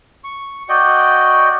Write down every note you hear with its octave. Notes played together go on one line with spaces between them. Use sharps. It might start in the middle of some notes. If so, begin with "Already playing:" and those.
C#6
F#4 D5 D#5 G5